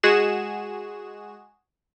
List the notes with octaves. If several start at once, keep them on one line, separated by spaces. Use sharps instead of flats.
G#3 F#4 G#4 E7